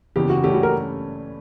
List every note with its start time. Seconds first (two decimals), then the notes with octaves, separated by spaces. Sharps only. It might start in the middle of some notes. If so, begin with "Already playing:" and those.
0.16 F#1 E2 C#3 E3 G4
0.30 F#4
0.44 G2 E3 A3 C#4 G4
0.54 F#4
0.63 A#4